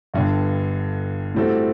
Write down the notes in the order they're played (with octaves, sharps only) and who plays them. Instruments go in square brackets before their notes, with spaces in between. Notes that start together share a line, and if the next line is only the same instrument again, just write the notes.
[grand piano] G1 G2 D3
A2 G3 C4 F#4 A4